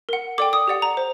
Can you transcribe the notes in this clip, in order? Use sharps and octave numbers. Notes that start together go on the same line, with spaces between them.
A#4 F#5
A4 D5 G5 D6
D#6
G4 D5 F#5
A#5
C5